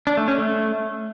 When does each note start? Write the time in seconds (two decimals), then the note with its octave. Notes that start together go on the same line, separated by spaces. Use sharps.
0.07 D4
0.17 A3
0.28 C#4
0.38 A3